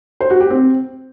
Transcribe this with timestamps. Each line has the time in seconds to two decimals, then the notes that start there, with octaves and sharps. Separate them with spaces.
0.21 C5
0.30 F#4
0.40 G4
0.50 C4